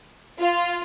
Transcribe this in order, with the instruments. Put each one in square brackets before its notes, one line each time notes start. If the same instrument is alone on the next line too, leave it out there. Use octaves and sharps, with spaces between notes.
[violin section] F4